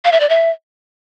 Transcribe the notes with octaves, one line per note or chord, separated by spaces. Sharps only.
F5
E5
D5
E5